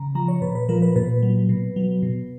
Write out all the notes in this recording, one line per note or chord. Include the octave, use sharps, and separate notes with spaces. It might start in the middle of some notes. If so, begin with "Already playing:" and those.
Already playing: C#3 A#5
F3 A#5
C#5
A#2 B4
B4
F3 A#4
B4
A#2 B4
F#3
B2
F#3
B2